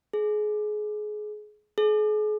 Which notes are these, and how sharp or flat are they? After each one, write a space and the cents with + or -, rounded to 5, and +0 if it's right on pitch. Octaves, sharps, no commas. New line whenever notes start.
G#4 +25
G#4 +40